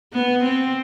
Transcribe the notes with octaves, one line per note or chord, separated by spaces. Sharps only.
B3
C4